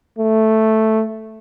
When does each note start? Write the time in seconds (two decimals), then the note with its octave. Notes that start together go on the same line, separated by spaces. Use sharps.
0.19 A3